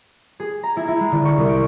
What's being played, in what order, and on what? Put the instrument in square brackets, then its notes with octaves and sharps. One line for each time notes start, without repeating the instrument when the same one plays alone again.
[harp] G#4
A#5
E4
E4
G#3
D3
C#6
C2
D7